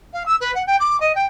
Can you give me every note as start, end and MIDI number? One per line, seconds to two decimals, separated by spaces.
0.13 0.23 77
0.25 0.35 88
0.40 0.53 71
0.55 0.62 78
0.67 0.76 79
0.80 0.99 86
1.00 1.12 75
1.15 1.25 79